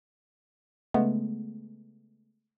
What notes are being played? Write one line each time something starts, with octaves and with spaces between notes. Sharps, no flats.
C#3 G#3 A3 B3